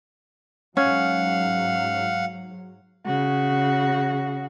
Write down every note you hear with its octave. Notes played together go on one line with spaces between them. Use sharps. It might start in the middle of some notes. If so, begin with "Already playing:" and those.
G#2 F#3 C#4 F5 F#5
C#3 F#4